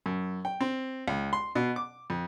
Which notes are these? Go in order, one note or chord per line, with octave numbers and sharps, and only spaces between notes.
F#2
G5
C4
C#2
C6
B2
D6
F2